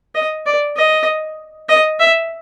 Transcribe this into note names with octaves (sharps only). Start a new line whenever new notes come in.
D#5
D5
D#5
D#5
E5